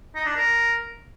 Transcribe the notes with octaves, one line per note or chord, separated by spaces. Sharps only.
D#4
D4
A#4